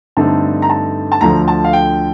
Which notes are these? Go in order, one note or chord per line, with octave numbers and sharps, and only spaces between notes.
G2 D3 A3 C4 D#4 A5
A#5
A5
A5
D2 D3 F3 A#5
A5
F5
G5